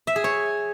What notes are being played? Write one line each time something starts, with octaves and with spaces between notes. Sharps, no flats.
E5
G#4
C#5